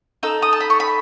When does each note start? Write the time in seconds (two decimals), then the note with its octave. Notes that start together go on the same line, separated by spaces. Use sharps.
0.23 D#4 A4 E6
0.42 D#6
0.53 A5
0.60 B5
0.70 C#6
0.80 B5